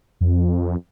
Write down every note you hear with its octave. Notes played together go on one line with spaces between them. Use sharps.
F2